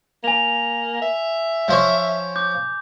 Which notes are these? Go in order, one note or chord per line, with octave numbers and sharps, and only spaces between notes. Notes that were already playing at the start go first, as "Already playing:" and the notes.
A#3 G#5 F7
E5
F3 C5 C#5
D6 G6